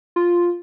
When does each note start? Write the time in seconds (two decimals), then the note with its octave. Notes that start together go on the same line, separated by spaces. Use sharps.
0.16 F4